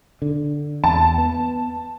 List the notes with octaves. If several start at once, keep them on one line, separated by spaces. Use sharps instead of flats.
D3
E2 A5
B3